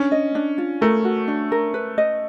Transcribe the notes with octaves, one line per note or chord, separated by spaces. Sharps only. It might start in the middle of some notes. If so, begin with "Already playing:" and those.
Already playing: C#4 D4
D#5
D4
F4
A3 A#4
F#4
D4
A#4
B4
D#5